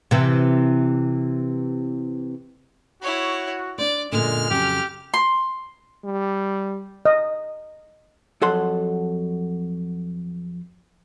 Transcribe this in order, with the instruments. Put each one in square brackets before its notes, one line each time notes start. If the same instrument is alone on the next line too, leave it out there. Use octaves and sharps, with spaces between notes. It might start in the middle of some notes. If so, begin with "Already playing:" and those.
[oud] C3 E3
[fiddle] E4 C#5 [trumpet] F#4
[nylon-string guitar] D4 C5 [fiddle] D5
[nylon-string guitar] F#2 A#2 D3 [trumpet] G#3 [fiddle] F6
[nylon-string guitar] F2 C#3 F#3 [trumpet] G4
[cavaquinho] C6
[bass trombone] G3
[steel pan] D#5
[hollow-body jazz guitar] F2 F#3 A4 F#5 C6